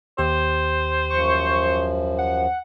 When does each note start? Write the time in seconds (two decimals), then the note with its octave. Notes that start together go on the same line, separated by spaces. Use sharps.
0.18 D#2 G4 C5
1.10 F#2 F3 C#6
2.18 F#5